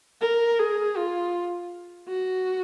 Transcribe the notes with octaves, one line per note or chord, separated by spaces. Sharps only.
A#4
G#4
F4
F#4